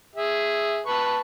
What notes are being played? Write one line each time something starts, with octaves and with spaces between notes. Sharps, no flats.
G#4 E5
B4 A5 C#6